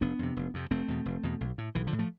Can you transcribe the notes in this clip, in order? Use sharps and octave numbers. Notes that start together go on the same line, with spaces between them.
F1 B3 D4
F2 C3
F1
F2 C3
F1 A3 C4
E2 B2
F1
E2 B2
B1
A2
B1 E3
D3 F3
A2
F3 A3